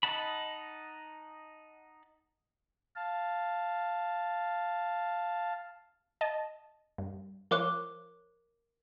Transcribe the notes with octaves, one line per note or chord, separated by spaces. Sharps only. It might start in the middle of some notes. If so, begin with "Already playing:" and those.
D#4 D#5 F#5 A5 B5
F5 A5
D#5 A5
G2
F3 A#4 C5 C#5 D6 F#6